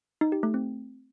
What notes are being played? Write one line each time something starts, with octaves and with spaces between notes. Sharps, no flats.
D#4
G4
A3
C4